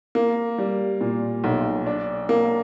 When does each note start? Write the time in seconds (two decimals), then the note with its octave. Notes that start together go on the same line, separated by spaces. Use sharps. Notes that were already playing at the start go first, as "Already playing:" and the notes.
0.15 A#3
0.58 G3
1.01 A#2
1.44 B1
1.86 D4
2.29 A#3